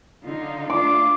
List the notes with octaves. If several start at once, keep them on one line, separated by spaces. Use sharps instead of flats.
D3 D#4 F4
A3 D4 F4 D6